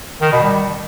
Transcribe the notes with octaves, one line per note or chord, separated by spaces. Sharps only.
D#3
B2
G3